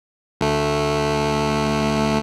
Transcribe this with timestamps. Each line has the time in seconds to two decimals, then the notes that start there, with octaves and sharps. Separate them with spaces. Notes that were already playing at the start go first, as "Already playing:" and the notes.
0.41 D2 A3